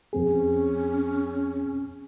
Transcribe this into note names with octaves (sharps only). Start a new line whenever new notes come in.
F2 C4 G#4
C#4